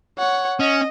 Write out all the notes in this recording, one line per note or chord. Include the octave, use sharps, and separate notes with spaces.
C#5 F#5
C#4 D#5